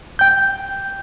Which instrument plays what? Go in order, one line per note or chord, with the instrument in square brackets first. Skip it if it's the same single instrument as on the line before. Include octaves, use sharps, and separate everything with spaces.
[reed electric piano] G5 G6